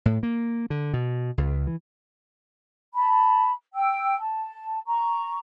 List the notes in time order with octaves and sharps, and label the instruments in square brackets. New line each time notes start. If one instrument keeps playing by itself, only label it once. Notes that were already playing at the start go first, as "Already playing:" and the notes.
[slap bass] A2
A#3
D3
B2
C#2
E3
[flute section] A5 B5
G5 E6
A5
A#5 C#6